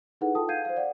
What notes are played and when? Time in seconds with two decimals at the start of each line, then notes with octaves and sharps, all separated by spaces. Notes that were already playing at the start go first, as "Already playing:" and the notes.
0.21 D#4 E4 G#4 A4 B4 F#5
0.35 F4 A4 G5 A5 D#6
0.48 F5 F#5 G6 G#6 C7 D#7
0.65 C5 F5
0.77 D5 F#5